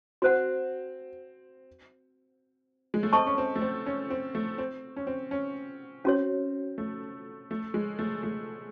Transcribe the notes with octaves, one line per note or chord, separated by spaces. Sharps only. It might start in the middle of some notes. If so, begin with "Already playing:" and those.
C4 F#4 C5 F#5
G#3
A3
C4 A4 D#5 A5 C#6
C#4
C4
A3
C4
C#4
C4
A3
C4
C#4
C4
C#4
C4 C#4 F#4 C#5
A3
A3
G#3
A3
A3